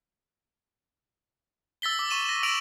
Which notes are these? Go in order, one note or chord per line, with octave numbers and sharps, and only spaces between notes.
E6 A6 B6 G7
D6
C#6 D#7 E7
A#6
E6 D7 D#7 F7 F#7